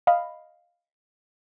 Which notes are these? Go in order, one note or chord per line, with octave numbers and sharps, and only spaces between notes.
D#5 F5 B5